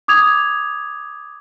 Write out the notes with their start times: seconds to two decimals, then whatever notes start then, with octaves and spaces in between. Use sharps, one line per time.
0.08 D6 D#6 G#6 F7